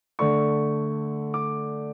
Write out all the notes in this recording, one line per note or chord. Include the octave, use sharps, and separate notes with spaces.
D3 A3 D4 C#6
D6